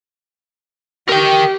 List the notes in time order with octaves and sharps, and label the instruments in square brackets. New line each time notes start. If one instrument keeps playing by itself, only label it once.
[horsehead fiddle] G4 [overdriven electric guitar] A#4 G5